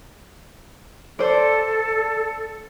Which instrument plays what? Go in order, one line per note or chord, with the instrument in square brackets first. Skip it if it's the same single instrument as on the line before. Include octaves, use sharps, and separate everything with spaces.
[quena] A4 [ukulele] C5 D5